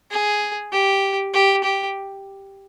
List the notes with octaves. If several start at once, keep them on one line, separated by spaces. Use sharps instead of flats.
G#4
G4
G4
G4